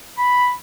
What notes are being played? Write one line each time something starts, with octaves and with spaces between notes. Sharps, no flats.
B5